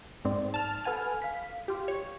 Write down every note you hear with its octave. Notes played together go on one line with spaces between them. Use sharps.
G#2 C4 D5
A5 F6
A4 B4 F#5 G#5 F6
F5 B6
F4 G4
C#5